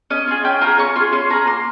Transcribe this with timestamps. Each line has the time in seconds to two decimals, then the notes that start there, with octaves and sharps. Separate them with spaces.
0.10 C#4 D#5
0.27 F4 G#4
0.44 C#4 G5
0.61 F4 G#4 A#5
0.78 C#4 C#6
0.96 F4 G#4 C6
1.13 C#4 C6
1.30 F4 G#4 A#5
1.47 A#3 C6